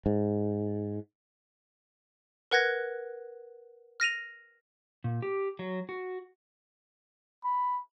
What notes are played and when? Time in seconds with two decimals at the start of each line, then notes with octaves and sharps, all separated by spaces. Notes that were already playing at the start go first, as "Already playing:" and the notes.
0.06 G#2
2.51 A#4 B4 F#5 F#6 G#6 A#6
4.00 F6 A#6 D#7 F7
5.04 A#2
5.22 G4
5.59 F#3
5.89 F#4
7.44 B5